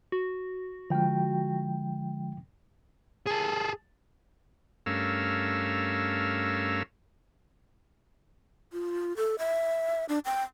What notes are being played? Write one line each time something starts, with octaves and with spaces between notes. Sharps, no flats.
F#4
D3 F3 G#3 G5
G#4 A4
G2 A3 C#4 A#4 F5 E6
F4
A4
E5
D4
G5